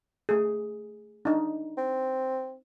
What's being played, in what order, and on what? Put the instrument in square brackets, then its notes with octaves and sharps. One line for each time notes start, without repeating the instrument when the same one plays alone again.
[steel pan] A3 G#4
D4 D#4
[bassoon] C4